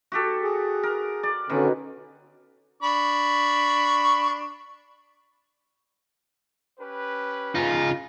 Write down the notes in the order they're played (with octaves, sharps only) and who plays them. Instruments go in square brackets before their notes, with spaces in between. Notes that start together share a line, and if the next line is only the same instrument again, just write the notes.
[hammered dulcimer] F#4 G4 A4
[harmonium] G#4
[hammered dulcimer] A#4
D5
[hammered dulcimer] B2 D#3 [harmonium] D3 C#4
[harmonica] D4 B5 C#6
[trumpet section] C#4 G4 B4
[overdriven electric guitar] C#3 D#4 [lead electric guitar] F4